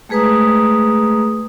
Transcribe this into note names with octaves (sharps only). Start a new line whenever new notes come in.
G#3 A3 G#4 B4 A#5 D#6